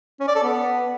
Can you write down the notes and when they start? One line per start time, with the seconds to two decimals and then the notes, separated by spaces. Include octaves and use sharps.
0.20 C#4
0.28 D5
0.35 A4
0.43 B3